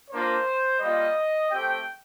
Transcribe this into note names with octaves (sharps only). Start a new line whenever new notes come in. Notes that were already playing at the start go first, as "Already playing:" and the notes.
A#3 D4 F4 C5
G3 A#3 F4 D#5
A3 C4 G4 G5